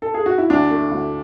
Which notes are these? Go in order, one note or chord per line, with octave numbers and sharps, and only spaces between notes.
A4
G#4
F#4
E4
D2 D4
A3
D2